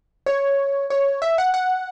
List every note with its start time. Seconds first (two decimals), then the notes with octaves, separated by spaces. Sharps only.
0.26 C#5
0.90 C#5
1.22 E5
1.38 F#5
1.54 F#5